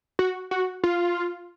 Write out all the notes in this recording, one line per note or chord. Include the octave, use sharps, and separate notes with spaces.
F#4
F#4
F4